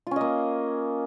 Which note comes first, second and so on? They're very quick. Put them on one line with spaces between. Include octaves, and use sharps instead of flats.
F4 C#4 D#5 A#3